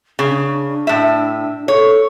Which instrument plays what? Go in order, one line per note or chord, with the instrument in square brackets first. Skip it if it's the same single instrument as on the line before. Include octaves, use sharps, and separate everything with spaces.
[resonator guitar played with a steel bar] C#3 [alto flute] D4
[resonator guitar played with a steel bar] A2 E5
[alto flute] A4 [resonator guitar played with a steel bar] C#5